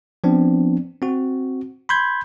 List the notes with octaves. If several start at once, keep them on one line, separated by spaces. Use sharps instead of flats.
F3 B3 C4 D4
C4 F#4
B5 C6 G6 G#6